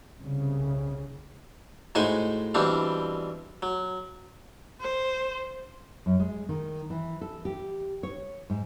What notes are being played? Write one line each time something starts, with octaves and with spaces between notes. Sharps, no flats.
C2 C#3
A2 G#3 D#4 F#4 C5 G#5
B2 E3 G3 C4 D4
F#3
C5
F#2
G#3
D#3
E3
A4
G4
C#5
G#2